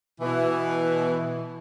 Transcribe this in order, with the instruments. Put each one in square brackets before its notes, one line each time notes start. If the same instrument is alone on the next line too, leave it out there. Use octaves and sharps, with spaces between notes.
[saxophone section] B2 E3